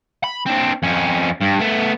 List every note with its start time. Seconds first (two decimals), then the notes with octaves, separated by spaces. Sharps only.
0.24 B5
0.46 C4 D4
0.83 F2 C#4
1.41 G2
1.59 A3 B3